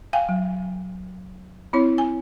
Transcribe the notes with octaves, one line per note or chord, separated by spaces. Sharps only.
F5 G5 G#5
F#3
C4 E4 C#5 C6
G#5